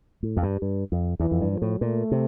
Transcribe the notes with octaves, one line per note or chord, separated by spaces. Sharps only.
A2
F2
G2
G2
F2
E2 E3
F2
G2
F3
A2
A#2 A3
C3